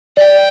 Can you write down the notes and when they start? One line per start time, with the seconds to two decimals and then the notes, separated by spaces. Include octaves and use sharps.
0.17 D5 G5